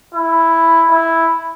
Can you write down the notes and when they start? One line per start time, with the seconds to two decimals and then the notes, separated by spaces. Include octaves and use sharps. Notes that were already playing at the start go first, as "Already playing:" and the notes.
0.14 E4
0.91 E4